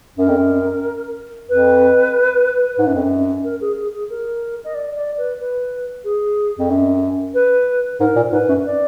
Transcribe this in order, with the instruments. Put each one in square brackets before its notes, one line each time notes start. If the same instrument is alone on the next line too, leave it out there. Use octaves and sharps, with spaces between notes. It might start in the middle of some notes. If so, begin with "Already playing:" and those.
[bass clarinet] F#2 [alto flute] A#4
[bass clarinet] F2
F#2
[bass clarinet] F2 [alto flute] B4
[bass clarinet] G#2
F#2
F2
F#2
[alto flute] A#4
G#4
G#4
G#4
A#4
D#5
D5
D5
B4
B4
G#4
[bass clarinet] F2
F#2
[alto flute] B4
[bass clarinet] G#2 [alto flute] A#4
[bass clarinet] A#2
[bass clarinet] G#2 [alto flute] B4
[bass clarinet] F#2
[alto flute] D5